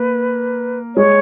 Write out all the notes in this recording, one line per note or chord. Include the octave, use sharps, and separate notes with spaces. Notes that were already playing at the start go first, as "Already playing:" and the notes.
Already playing: A#3 B4
G#3 C#5